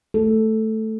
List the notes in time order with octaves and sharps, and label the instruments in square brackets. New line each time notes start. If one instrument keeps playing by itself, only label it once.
[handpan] A3 A4